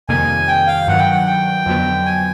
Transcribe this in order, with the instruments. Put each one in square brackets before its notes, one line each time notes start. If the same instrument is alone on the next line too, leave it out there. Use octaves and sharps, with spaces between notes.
[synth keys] F2 C3 D#3 G3 A#3 [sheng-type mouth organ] G#5
[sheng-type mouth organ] G5
F5
[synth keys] G2 D#3 F#3 [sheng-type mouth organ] F#5
[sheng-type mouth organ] G5
F#5
G5
[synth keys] F2 D3 F#3 B3
[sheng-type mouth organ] G#5